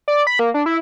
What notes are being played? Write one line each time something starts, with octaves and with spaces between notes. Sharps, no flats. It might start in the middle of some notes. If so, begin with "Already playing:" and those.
D5
B5
A#3
D4
E4